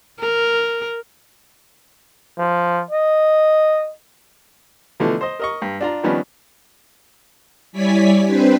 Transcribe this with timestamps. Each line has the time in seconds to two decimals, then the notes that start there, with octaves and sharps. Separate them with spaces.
0.20 A#4
2.38 F3
2.91 D#5
5.00 B2 D3 E3 F3 A3
5.21 C5 D#5
5.40 A#4 D#5 C#6
5.62 G2
5.81 D4 F4 A#5
6.03 D#3 F3 G3 B3 C#4 D4
7.72 G3 E4 C#5 D5 G#5 B6
8.25 C4 D4 G4 B4 C5